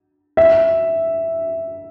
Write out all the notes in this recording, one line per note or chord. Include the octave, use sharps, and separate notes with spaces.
E5